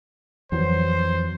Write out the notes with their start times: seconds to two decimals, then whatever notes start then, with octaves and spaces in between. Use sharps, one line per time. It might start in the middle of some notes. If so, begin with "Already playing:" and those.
0.52 F2 E3 F#3 C5